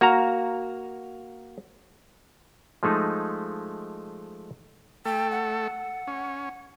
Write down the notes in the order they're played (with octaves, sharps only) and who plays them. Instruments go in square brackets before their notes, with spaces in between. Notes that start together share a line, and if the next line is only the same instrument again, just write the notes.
[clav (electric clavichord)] A#3 F#4 F5 A#5
F3 G#3 A3 D#4
[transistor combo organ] A3 A4 [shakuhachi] G5
[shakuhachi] F#5
[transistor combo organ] C#4